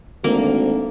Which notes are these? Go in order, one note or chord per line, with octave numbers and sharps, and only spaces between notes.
G#1 D2 A#3